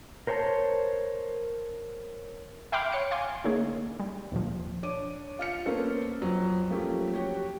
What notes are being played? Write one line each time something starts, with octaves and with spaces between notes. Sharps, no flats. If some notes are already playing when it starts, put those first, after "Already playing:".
A#4 C5 C#5 G#5 A5
E5 G5 B5 C6 D6 F6
C#5 F#5 C#7
F5 G#5 C6 D6
D3 A3 A#3 C#4 D#4 G#4
G3
D#2 A#2 F3
D4 C#5 D6 D#7
F4 F6 C#7
A#3 B3 C#4 A4 C5
F2 F#3
F3 F#3 A3 A#3 C#4 G4
F#4 G4 C#5